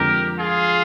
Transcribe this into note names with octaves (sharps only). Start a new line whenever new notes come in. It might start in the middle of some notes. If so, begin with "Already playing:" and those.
Already playing: F2 D3 G#3 C4 G4 A#4
F4 G#4